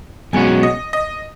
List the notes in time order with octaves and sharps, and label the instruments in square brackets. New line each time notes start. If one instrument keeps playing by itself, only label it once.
[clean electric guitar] B1 B2 G#3 C#4 F#4 [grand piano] G#5
[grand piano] D#5
D#5